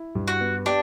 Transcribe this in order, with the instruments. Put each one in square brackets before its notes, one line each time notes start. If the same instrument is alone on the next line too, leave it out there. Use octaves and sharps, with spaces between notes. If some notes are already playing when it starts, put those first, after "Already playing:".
Already playing: [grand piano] E4
G2
[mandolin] F#4
[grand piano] B3
[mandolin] D4 [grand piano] G4